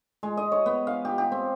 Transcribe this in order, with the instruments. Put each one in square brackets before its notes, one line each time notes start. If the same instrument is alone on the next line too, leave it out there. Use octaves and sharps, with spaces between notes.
[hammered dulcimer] G#3
D#5
C#5
B3
F5
G4
G4
C4